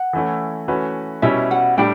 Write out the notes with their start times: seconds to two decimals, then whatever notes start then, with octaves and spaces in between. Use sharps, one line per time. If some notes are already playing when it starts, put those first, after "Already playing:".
Already playing: F#5
0.13 E3 A3 C#4 E4
0.68 E3 A3 C#4 F#4 B4
1.22 B2 G3 C#4 E4 E5
1.51 F#5
1.78 A2 G3 D4 G5